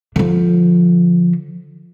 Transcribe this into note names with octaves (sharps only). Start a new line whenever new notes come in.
D3 F3